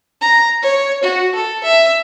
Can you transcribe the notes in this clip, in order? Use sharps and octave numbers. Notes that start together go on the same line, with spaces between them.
A#5
C#5
F#4
A4
E5